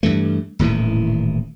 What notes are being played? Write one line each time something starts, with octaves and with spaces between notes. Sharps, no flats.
G2 E3 A3
D#1 A2 D#3 E3